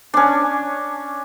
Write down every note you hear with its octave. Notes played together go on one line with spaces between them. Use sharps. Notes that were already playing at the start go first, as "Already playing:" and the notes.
C#4 D4